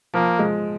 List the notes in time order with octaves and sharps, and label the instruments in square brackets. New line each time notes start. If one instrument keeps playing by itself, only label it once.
[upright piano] F3 [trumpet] A#3
[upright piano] G#3